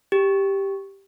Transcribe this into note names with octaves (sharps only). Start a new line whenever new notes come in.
G4